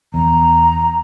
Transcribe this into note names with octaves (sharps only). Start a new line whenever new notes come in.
E2 A#5